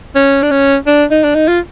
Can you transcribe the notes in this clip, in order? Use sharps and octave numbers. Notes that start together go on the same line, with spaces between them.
C#4
D4
C#4
D4
D#4
D4
D#4
F4